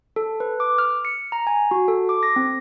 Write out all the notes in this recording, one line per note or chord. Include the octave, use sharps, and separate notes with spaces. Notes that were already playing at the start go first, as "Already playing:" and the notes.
A4
B4
D6
F6
C#7
A#5
G#5
F#4
A4
D6
A#6
C4